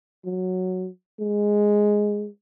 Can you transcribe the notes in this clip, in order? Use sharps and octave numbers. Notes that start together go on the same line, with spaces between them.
F#3
G#3